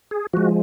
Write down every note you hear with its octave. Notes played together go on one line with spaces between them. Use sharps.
G#4
F3 G#3 F#4